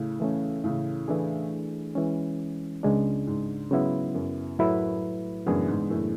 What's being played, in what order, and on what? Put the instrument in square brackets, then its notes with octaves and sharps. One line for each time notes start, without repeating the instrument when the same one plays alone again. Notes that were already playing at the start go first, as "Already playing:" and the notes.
Already playing: [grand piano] A2 C#3
[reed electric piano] E3 A3 C#4
[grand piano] A2 C#3
[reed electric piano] E3 A3 D4 G#4
E3 G#3 C#4
C#2 C#3 G#3 D4
[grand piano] G#2
[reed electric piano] C#3 F#3 B3 E4
[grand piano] F#2
[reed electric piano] A2 F#3 A3 E4 B4
[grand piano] F#2 A2 [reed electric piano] C#3 E3 B3 D4 G#4
[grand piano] G#2
F#2 A2